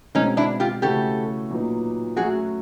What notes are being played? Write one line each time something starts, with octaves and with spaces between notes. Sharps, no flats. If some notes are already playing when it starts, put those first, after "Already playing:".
B2 G#3 C4 C#4 D#4
D4 E4
F4 G4
C#3 E3 A3 C#4 F#4 G4 A4
A#2 F#3 B3 D#4
F#3 A3 C#4 F#4 G#4